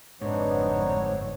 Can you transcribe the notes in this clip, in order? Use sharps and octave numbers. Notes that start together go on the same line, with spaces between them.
G1 F2 G#2 B3 C4 D4 D#4 C#5